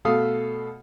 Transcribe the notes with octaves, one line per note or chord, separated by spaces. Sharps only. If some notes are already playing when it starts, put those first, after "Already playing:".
B2 A3 A4 F5 D#6